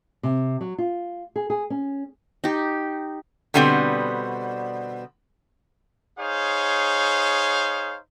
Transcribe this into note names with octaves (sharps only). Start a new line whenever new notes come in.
C3
F#3
F4
G#4
G#4
C#4
D#4 G4
B2 D3 G3 B3 C4
D#4 G#4 C5 C#5 F5